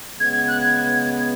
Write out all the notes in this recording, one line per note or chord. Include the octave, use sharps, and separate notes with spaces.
C#3 G#3 B3 G#6
G#6
F#6
G#6